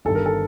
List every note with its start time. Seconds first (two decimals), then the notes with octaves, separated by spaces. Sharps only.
0.05 G1 G2 D#3 A4
0.15 A#4
0.26 A4